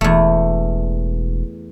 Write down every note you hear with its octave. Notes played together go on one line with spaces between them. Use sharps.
E1 E2 A3